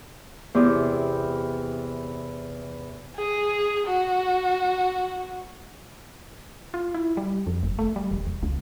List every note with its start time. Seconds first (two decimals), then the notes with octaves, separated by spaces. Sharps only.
0.54 E2 C3 E4 G4
3.16 G#4
3.87 F#4
6.74 F4
6.94 E4
7.17 G3
7.47 F2
7.63 F#1
7.79 A3
7.96 G3
8.11 E1
8.26 E1
8.43 C#2